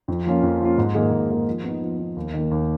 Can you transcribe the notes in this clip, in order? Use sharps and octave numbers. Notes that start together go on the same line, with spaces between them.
F2
F3 A#3 C#4 F4
F2
F3 A#3 C#4 F4
G#2
D#3 A#3 D#4 G#4
G#2
D#3 A#3 D#4 G#4
F3
B3 D#4
F3
B3 D#4
D#2
D#3 A#3
D#2